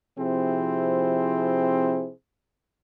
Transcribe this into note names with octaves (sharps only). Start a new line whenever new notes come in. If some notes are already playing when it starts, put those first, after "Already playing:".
C3 F3 C4 E4 G#4 C5